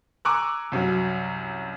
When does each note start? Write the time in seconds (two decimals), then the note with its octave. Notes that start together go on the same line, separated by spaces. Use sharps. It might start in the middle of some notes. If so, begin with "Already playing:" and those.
0.25 G#5 A#5 C#6 D6 E6 F#6
0.72 C2 F#2 F#3